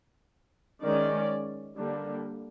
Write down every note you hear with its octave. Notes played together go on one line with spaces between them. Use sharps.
D#3 G#3 C#4 D5
D3 G3 A#3 D4